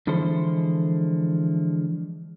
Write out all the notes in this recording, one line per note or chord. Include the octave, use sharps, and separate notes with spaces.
D3 E3 F3 G#3 A4 C5